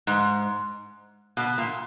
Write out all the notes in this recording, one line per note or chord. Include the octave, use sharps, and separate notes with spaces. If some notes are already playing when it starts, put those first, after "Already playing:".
G#2
B2
A#2